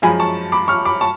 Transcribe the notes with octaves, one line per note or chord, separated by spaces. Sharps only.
F#2 F3 G#3 G#5 B5
A5 C#6
B5 D6
C#6 F6
B5 D6
A5 C#6